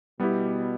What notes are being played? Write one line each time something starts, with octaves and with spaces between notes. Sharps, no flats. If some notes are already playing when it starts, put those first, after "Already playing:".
B2 G3 B3 E4 G4